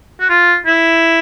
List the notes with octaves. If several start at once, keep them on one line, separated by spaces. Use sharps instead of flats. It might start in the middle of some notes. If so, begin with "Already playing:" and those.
F#4
F4
E4